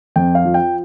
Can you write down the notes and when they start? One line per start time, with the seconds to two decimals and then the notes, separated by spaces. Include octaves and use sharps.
0.16 F2 G5
0.35 F5
0.45 F3
0.54 G5